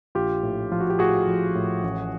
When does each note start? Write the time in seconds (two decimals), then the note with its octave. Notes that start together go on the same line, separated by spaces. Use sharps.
0.15 A#1 F4 G4
0.43 A2
0.72 F3 F4
0.81 F#4
0.90 G4
0.99 A2 F#4 G#4
1.27 F3
1.55 A2
1.83 A1